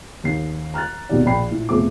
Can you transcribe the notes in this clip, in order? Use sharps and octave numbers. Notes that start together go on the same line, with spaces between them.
D#2 C7
A#5 F6 F#6 A6
G#1 D#2 B2 D#3 G4 D5
A#1 D5 G5 B5 C7
A#2 E4
F1 F2 A3 B3 G#4 D6